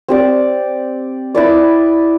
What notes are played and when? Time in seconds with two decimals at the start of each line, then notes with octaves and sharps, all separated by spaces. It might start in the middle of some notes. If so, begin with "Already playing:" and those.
0.08 C4 G4 D5
1.35 E4 B4 D5